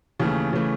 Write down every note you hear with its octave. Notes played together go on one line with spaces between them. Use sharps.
D#2 C#3 E3 A3
C#3 E3 A3